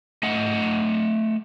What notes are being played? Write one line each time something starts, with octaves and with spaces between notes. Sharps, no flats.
A3 D#5 F#5